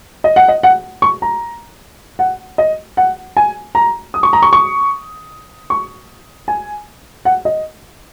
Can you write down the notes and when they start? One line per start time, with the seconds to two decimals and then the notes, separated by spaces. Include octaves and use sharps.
0.24 D#5
0.36 F#5
0.48 D#5
0.63 F#5
1.02 C#6
1.22 A#5
2.19 F#5
2.58 D#5
2.97 F#5
3.37 G#5
3.75 A#5
4.14 D#6
4.23 C#6
4.33 A#5
4.42 C#6
4.53 C#6
5.70 C#6
6.48 G#5
7.25 F#5
7.45 D#5